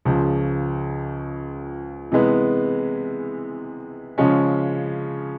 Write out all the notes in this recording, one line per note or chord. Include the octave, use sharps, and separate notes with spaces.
C#2 C#3 F3
C3 E3 G#3 B3
C#3 F3 G#3 C#4